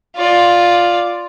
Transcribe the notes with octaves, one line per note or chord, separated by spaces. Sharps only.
F4 D5